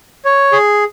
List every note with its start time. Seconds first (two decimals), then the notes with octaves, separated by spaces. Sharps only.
0.25 C#5
0.52 G#4